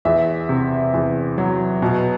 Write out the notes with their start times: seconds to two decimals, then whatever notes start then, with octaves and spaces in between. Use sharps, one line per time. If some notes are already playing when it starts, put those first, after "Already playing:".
0.05 E2 E5
0.49 C3
0.94 E2
1.38 F#3
1.82 B2